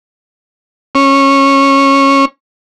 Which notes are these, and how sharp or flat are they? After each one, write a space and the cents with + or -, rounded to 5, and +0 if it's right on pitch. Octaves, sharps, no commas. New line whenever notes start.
C#4 -15